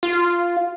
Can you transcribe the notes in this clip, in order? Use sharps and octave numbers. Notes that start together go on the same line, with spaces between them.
F4